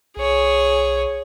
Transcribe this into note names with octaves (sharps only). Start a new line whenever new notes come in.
B1 G#4 C#5